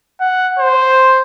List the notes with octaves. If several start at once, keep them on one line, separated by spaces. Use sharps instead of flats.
F#5
C5